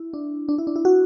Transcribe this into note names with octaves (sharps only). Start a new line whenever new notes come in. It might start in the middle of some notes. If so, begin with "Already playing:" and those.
Already playing: E4
D4
D4
E4
D4
E4
F#4